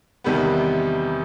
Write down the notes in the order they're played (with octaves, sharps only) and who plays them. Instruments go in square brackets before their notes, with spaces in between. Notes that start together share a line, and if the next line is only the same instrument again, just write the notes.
[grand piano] E2 C3 D#3 G3 B3